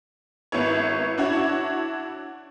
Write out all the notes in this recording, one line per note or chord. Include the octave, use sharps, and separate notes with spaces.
G#1 B3 E4 C#5
D4 E4 F#4 C#5